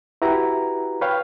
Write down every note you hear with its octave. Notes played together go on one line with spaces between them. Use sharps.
E4 F#4 G4 B4 A#5
B4 C#5 F5 G5